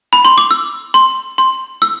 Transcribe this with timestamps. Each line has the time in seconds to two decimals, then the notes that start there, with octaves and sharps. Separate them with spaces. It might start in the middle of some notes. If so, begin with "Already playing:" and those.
0.13 B5
0.25 C6
0.38 D6
0.51 E6
0.94 C6
1.38 C6
1.82 E6